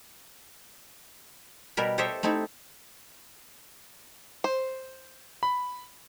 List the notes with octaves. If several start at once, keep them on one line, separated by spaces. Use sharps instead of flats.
B2 G3 A#4 B5
G4 A4 C5 C#5 D#5 E5
A3 C4 D#4 E4 A4
C5
B5